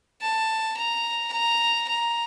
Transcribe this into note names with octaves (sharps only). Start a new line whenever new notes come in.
A5
A#5
A#5
A#5